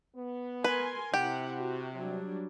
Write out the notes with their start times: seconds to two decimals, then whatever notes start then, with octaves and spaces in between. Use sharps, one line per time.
0.16 B3
0.64 A#4 B4 G#5 C6
1.14 C3 E4 G4 F#5
1.60 F#4
1.97 F#3 G3 D4